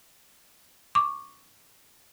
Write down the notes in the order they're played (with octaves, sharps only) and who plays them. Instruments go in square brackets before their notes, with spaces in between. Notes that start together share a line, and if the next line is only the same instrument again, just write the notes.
[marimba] C#6 D6